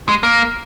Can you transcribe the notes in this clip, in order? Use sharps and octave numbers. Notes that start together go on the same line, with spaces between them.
G#3
A#3